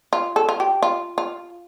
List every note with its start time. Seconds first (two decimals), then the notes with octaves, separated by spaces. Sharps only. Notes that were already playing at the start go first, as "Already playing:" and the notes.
0.13 F4
0.36 A4
0.49 F4
0.60 G4
0.83 F4
1.18 F4